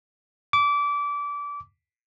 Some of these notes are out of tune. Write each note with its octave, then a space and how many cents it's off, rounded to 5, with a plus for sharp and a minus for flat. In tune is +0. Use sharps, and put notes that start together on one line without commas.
D6 -25